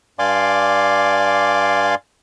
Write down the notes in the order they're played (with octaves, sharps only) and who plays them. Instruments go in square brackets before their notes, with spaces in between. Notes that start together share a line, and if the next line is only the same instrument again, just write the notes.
[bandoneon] G2 D5 F5 G#5 C6 D6